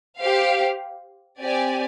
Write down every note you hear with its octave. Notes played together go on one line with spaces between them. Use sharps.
G4 C5 F5
C4 G4 D5 G#5